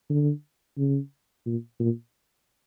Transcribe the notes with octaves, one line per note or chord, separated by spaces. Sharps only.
D3
C#3
A#2
A#2